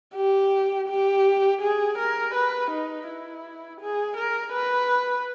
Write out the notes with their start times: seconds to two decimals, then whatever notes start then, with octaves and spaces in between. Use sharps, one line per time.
0.15 G4
0.88 G4
1.61 G#4
1.98 A#4
2.35 B4
2.71 D#4
3.08 E4
3.81 G#4
4.17 A#4
4.54 B4